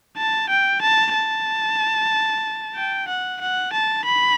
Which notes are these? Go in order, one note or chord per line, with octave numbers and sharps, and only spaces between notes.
A5
G5
A5
A5
G5
F#5
F#5
A5
B5